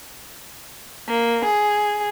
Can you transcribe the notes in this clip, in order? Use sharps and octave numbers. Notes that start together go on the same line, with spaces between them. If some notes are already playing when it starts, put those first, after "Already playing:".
A#3
G#4